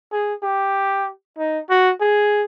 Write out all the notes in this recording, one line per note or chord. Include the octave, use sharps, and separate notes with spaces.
G#4
G4
D#4
F#4
G#4